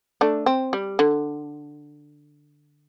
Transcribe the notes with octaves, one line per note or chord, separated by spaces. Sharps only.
A3 D4
C4
G3
D3